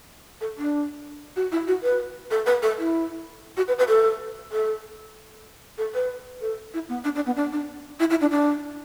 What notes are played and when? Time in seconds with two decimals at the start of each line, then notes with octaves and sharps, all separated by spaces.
0.41 A4
0.58 D4
1.36 F#4
1.52 E4
1.68 F#4
1.83 B4
2.31 A4
2.46 B4
2.63 A4
2.78 E4
3.57 F#4
3.68 B4
3.79 B4
3.88 A4
4.52 A4
5.78 A4
5.95 B4
6.41 A4
6.74 E4
6.89 B3
7.04 D4
7.15 D4
7.26 B3
7.36 D4
7.52 D4
8.00 E4
8.10 E4
8.21 D4
8.31 D4